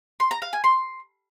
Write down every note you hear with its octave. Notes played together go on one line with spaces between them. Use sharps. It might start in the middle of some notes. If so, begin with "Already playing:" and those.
C6
A#5
F5
G#5
C6